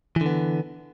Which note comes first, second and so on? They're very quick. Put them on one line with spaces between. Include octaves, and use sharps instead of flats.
E3 D3 B3